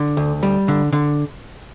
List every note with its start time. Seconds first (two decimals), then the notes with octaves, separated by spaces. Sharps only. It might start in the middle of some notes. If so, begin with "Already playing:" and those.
Already playing: D3
0.17 D2
0.43 G3
0.68 D3
0.93 D3